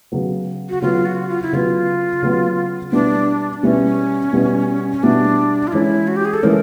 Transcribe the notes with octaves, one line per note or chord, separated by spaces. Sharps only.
C#3 F#3 B3
F#4
C#3 F#3 B3 F4
F#4
F4
E4
C#3 F#3 B3 F4
C#3 F#3 B3
B2 G3 B3 D4 E4
B2 G3 B3 C#4 E4
B2 G3 B3 E4
C#4
B2 G3 B3 D4 E4
F4
E3 G#3 C#4 E4
F#4
G4
G#4
A4
E3 G#3 C#4 A#4